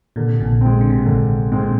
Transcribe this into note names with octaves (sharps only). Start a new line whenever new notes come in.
A#2 D3
C3
A#1 A#2
G#3 C4
D3
C3
A#2
G#1 G#2 D3
G#2 G#3 C4
A#2